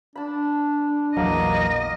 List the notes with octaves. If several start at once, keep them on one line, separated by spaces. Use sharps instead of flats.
D4 A5 B5
A#1 E2 F#3 A#3 D#5